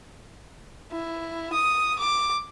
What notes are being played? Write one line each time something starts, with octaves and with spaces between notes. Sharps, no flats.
E4
D#6
D6